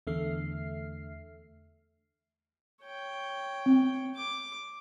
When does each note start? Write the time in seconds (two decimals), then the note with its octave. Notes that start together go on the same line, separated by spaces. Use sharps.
0.07 E2 D3 A3 E5 F6 C7
2.82 C#5 G5
3.66 C4
4.16 D6